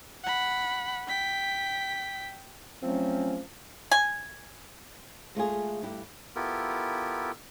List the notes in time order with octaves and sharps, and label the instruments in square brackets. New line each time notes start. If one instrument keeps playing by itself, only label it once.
[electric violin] F#5 B5
G5 B6
[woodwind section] F3 F#3 A3 C4 C#4
[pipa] G#5
[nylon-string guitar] G#3 A3 F4 G#4
G2 E4 G4
[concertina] B3 E4 F4 G4 A4 A#4